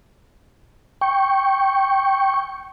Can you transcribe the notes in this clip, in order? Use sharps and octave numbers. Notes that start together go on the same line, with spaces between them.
G5 C#6